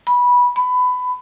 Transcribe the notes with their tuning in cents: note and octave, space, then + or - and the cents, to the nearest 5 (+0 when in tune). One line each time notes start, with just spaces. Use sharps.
B5 -15
B5 +20